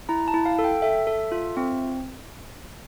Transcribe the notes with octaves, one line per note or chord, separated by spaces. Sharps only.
E4 A#5
A5
E4
F5
A4
G5
A4 E5
A4
F4
C4